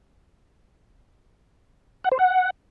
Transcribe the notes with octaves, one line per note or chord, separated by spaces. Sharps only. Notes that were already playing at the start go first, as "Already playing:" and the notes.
F#5
C5
F#5